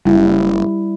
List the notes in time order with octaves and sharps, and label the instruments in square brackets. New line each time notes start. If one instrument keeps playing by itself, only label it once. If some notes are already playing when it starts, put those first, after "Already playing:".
[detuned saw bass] F#1 [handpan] G3 E4